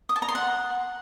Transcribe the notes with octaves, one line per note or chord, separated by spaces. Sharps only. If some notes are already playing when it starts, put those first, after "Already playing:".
D#6
A5
A#5
C6
F#5